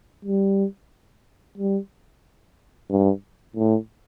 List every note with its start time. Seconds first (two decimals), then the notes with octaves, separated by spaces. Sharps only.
0.25 G3
1.58 G3
2.90 G2
3.56 A2